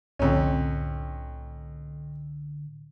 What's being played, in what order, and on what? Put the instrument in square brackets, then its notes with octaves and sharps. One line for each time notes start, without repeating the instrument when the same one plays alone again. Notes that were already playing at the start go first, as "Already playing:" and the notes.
[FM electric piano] C2 A2 D3 [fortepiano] F2 C#4